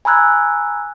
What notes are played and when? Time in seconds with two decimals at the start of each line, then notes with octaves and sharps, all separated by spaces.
0.05 G#5 A#5 B5 E6 F#6 G#6